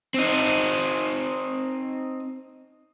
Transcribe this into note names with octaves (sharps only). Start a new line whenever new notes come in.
C4 D#4